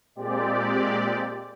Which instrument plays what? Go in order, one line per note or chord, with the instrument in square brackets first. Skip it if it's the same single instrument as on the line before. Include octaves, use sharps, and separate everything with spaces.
[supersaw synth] A#2 G#3 C4 G4 D5